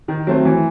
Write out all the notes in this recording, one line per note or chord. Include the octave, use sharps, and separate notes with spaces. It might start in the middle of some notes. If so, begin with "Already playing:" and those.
D#3
F#3 A3 C4
E3